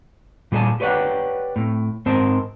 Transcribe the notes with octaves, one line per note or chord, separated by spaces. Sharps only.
A#2 G3 G#4 C5 G#5 A5
G4 B4 C#5 D5 F#5 G5
A2 C4
G#2 C4 A#4 C5 A5